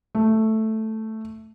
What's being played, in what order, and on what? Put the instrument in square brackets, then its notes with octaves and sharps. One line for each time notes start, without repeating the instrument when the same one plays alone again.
[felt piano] A3